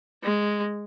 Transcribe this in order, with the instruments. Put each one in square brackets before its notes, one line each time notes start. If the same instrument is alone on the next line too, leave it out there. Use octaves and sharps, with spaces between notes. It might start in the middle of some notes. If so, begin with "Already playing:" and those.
[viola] G#3